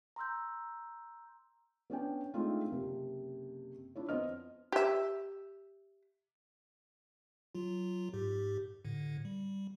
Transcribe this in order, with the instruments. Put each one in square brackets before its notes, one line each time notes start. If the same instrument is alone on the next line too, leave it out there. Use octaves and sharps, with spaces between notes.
[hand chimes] A#5 C6 E6 G6
[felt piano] B3 C#4 D4 G5
G#3 A3 C4 D4 D#4 F4
F#1 C3
D4 E4 F4 C#5
F2 B3 C5 D#5 F6
[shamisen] G4 E5
[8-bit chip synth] F#3 F4
G#2 G4
A2 D3
G3